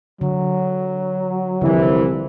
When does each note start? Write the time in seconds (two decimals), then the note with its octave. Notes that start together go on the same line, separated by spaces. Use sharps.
0.21 D3 F#3
1.61 C2 D3 E3 F3 E4